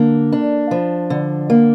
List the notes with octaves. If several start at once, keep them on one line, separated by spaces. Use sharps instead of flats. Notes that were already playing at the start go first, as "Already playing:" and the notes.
Already playing: D3 A#3
D4
F3
D3
A#3